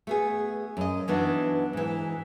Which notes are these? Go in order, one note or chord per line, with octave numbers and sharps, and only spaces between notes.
A3 B3 G#4
F#2 D#5
E3 F#3 B3 D4 D#4
G#2 E3